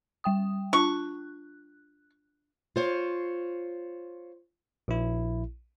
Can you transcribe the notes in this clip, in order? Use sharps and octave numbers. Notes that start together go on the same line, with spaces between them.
G3 G5 D#6
D4 F4 A5 C#6 F#6
F4 C5 C#5
A#1 E4